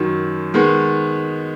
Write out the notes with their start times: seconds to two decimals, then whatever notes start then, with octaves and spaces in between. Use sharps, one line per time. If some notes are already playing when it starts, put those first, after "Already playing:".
Already playing: F#2 D#3 F#3
0.54 D#3 G#3 B3